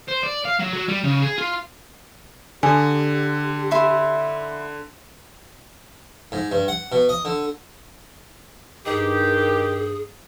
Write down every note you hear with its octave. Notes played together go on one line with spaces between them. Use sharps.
C5
D5
F5
F#3
F#3
G3
C#3
G#4
F4
D3 G4 G#5 D#6
E4 E5 C6
G#2
G2
F#5
B2
D#5
D3
G2 D#3 G4 G#4